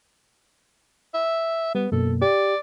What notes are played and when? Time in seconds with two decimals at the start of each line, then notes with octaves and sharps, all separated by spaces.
1.14 E5
1.75 G3 B3
1.92 F#2 B2 A#3 A4
2.22 G4 D5